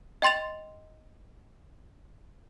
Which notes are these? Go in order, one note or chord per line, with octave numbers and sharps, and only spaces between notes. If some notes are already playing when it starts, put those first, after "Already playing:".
D#5 G5 C6 A6 F7